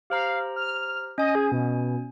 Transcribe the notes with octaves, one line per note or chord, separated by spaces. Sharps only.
G4 C5 F5 A#5
F6
C#4 D#5 G#5
G#4
B2